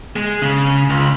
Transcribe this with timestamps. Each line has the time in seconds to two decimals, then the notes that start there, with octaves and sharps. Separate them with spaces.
0.16 G#3
0.42 C#3
0.90 C#2